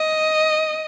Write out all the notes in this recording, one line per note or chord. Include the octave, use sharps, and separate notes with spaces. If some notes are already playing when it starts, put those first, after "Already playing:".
Already playing: D#5